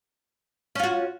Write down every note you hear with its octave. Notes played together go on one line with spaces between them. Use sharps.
C#4 F4 F#4